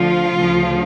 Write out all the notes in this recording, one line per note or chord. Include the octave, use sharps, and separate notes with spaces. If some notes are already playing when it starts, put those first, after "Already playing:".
Already playing: D2 D3 F3 F4
D2 C#3 F3